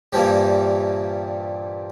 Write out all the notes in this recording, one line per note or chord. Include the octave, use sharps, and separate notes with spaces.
G2 A#2 E3 F3 G3